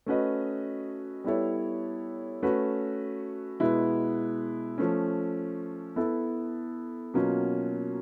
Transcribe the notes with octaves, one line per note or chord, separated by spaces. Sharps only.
A3 C#4 F#4 B4 D#5
G3 B3 E4 A4 C#5
A3 C#4 F#4 B4
B2 G#3 B3 E4
F3 A3 C#4
B3 E4 A4
B2 F#3 A#3 C#4 F4